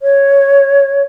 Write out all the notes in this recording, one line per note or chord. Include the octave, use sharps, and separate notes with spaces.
C#5